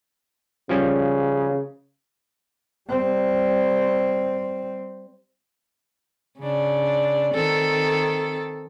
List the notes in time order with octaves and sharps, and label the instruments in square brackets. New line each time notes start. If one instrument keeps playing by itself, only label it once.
[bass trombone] C#3 [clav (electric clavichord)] F3 G3 C#4
[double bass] G3 C4
[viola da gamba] C#3 D4
D#3 C4 A4